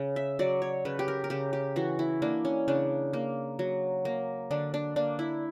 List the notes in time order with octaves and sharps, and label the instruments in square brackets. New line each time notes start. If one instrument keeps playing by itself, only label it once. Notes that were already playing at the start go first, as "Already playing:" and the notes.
Already playing: [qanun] C#3
E5
F#3 D5
C#5
C#3 B4
G4
A#4
A#4
C#3 G4
G4
E3 F#4
E4
A#3 D4
C#4
C#3 D4
A#3
F#3
A#3
D3 D4
D4
A#3 D4
E4